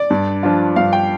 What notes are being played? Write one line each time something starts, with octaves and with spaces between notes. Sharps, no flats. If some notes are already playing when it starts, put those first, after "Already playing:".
Already playing: D5
G2
F3 D4 F4
G2 F5
G5